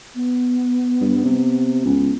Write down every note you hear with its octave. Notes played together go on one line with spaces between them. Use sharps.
B3
G2
C3
C#2